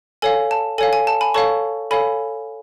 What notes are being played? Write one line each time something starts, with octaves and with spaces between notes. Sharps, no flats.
A4 C#5 F5 G#5
A5
A4 C#5 F5 G#5
G#5
A5
G#5 B5
A4 C#5 F5 A5 C#6
A4 C#5 F5 G#5 B5